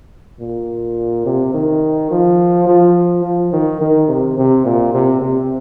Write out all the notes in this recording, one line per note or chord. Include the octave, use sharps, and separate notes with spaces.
A#2
C3
D#3
F3
F3
F3
D#3
D#3
C3
C3
A#2
C3
C3